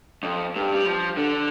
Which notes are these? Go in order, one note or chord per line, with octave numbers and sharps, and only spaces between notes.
F2
G2
G3
F3
D3